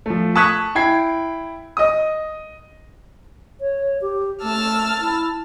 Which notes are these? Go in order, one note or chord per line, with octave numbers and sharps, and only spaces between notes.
F3 A3
A5 C#6 D#6 F#6 G#6 B6
E4 G5 G#6 C7
D#5 D#6
C#5
G4
A3 A5 E6 F6
E4